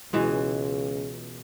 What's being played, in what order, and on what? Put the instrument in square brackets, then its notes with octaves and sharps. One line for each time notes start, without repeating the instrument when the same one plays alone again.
[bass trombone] C#2 [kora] B2 E3 G#3